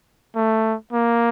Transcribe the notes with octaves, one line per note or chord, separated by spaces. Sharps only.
A3
A#3